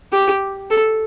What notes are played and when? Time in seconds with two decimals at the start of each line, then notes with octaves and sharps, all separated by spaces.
0.13 G4
0.70 A4